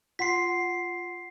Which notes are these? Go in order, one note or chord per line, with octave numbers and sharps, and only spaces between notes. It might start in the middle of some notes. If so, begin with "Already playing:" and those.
F4 F#5 C6 B6 C7